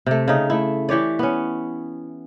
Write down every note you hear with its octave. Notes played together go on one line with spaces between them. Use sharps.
C3 A3
C#3 D#4
A3 E4
E3 G4 C#5 D5
B3 C#4